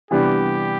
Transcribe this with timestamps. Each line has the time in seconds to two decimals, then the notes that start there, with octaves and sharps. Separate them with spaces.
0.11 C3 E3 G3 B3 D4 G4